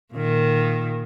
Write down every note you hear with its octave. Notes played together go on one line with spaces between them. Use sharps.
A#2 D#3